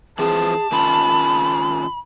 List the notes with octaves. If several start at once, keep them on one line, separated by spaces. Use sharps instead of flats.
E3 F3 C4 G#4 A5
D#3 C#4 F4 B5